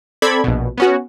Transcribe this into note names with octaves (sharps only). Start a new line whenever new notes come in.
C4 A4 D5 B5 G#6
A#1 B2
B3 C#4 F#4